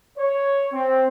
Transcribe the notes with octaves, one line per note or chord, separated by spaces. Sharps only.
C#5
C4